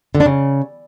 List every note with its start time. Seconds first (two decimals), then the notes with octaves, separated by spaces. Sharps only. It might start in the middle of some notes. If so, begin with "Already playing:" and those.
0.15 D3
0.20 D4
0.26 C#3